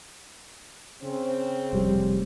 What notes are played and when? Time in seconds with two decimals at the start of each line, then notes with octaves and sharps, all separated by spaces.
1.01 C#3 C4
1.73 F1 G3